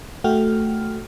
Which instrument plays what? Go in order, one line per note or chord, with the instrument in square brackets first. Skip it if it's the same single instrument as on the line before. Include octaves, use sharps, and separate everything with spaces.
[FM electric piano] A3 F#4 G5 F6